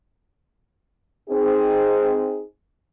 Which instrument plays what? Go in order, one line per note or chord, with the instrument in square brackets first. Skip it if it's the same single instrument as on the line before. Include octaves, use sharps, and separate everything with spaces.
[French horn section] C4 D#4 G#4